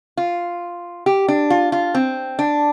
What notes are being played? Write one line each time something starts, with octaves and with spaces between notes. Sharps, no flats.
F4
G4
D4
F4
F4
C4
D4